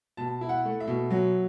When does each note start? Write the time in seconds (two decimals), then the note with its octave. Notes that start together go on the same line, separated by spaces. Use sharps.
0.17 B2 A5
0.41 E4
0.49 F#5
0.65 A3
0.80 E5
0.87 B2
1.11 F#3